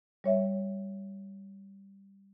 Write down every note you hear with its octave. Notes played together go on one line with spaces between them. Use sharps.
G3 C#5 E5